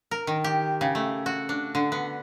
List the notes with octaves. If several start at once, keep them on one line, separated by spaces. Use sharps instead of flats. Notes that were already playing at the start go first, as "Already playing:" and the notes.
A#4
D#3
G4
C#3
A3
F#4
D4
D3
B3